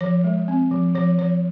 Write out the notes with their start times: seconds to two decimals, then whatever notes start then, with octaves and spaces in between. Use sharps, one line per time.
0.01 F3 C#5
0.24 G#3
0.48 C4
0.71 F3
0.95 F3 C#5
1.18 F3 C#5